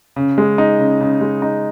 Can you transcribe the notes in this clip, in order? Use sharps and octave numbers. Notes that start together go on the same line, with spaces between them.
C#3
G#3
D#4
C#3
C#3
G#3
D#4